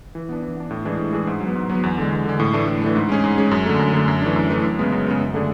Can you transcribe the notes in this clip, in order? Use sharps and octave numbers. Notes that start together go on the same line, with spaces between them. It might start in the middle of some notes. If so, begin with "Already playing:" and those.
E3
B3 D4
E3
B3 D4
A2
E3 G#3 D4 G#4
A2
E3 G#3 D4 G#4
G#2
F#3
B3
G#2
F#3 B3
E2
D3 G#3
E2
D3 G#3
A2
E3 A3 D4
A2
E3 A3 D4
G#2
G#3 C#4 G#4
G#2
G#3 C#4 G#4
F#2
D3 A3
F#2
D3 A3
F#2
E3 A3 D4
F#2
E3 A3 D4
F#2
C#3 G#3 B3
F#2
C#3 G#3 B3
F#2
D3 A3 D4 G#4